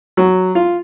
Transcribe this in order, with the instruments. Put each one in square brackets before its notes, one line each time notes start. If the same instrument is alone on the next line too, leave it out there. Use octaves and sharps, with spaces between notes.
[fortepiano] F#3
F4